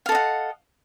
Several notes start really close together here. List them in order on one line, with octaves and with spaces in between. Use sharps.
F5 A4 D#5 F#5